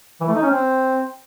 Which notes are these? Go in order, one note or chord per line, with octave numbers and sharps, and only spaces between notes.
E3
A3
D#4
C#4
C4